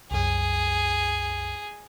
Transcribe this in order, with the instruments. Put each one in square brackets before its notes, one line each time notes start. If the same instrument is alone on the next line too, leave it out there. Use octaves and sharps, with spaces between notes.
[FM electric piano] C2 F#2 [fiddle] G#4